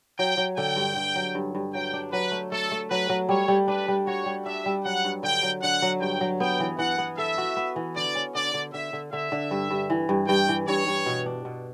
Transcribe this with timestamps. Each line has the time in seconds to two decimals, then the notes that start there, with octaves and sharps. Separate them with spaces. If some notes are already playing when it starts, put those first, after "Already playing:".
0.19 F#3 G5
0.37 F#3
0.57 D3 G5
0.76 G2
0.96 D3
1.16 F#3
1.35 G2
1.55 G2
1.73 F#3 G5
1.93 D4
2.12 F#3 B4
2.32 A3
2.52 A3 A4
2.72 A3
2.91 F#3 B4
3.09 F#3
3.29 G3 C#5
3.48 G3
3.68 D4 B4
3.88 G3
4.06 F#4 C#5
4.26 G3
4.45 D4 E5
4.66 G3
4.84 F#3 F#5
5.05 G2
5.23 D3 G5
5.43 F#3
5.63 D3 F#5
5.82 F#3
6.01 G2 G5
6.21 F#3
6.40 B3 G5
6.60 E3
6.79 E3 F#5
6.98 B3
7.18 A4 E5
7.38 F#4
7.57 B3
7.76 E3
7.96 D3 D5
8.15 C#4
8.34 D3 D5
8.54 D3
8.73 D3 E5
8.93 D3
9.12 D3 E5
9.32 D3
9.51 G2
9.71 G2
9.90 E3
10.09 G2
10.28 G2 G5
10.49 E3
10.67 G2 C#5
10.87 G2
11.06 B2
11.26 D4
11.45 B2